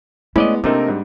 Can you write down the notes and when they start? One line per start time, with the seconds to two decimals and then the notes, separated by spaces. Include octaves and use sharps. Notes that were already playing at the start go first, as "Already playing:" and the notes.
0.36 G#3 A3 B3 C#4 E4 D5 D#5
0.64 C3 A3 A#3 C4 D4 D#4 A#4
0.88 G#2 G3